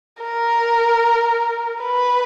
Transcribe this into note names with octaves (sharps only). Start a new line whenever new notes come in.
A#4
B4